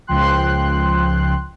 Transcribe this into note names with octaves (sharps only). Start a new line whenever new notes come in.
C#2 F3 G5 C6 F#6